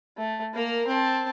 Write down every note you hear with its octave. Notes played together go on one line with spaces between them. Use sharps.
A3
A#3 A#4
C4 A5